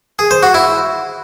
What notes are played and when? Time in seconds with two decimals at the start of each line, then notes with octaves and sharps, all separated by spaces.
0.19 G#4
0.31 C5
0.43 F#4
0.55 E4